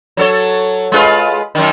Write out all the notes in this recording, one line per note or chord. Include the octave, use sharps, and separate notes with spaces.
F#3 A4 C#5
G#3 F4 B4
F#2 D#3